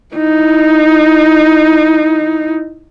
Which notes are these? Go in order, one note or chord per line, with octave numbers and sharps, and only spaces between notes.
D#4 E4